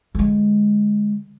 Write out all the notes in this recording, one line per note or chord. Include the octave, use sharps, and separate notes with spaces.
D3 G#3